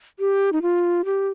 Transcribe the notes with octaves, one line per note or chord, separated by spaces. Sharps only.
G4
D#4
F4
G4